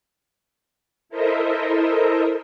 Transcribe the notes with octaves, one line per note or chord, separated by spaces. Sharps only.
E4 A4 A#4 C5 D#5 E5